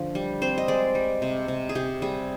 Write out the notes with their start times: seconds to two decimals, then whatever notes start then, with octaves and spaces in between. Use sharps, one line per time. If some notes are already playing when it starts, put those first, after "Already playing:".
Already playing: D3 F3
0.15 G3
0.42 C4 C5
0.58 D#5
0.68 G#3 D5
0.95 G3
1.22 C3
1.48 C3
1.69 G#4
1.75 C3 G4
2.02 G3 G#4